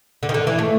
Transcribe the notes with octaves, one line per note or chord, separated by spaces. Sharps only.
D3
D#3
D3
E3
A3